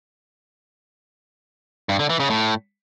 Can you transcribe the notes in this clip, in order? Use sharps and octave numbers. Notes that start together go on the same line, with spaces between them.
G2
D3
E3
C#3
A2